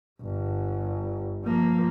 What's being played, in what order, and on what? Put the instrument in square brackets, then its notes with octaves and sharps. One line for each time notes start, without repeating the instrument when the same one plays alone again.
[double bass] G1
F3 A#3